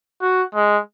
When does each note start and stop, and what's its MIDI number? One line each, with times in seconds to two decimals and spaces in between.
0.22 0.43 66
0.55 0.79 56